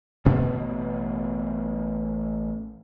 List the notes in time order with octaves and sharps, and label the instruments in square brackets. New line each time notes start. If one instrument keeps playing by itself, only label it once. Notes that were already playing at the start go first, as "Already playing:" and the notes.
[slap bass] A1 B2 B3